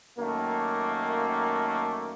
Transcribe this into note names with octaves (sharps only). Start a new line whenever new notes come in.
F#2 D#3 A3 A#3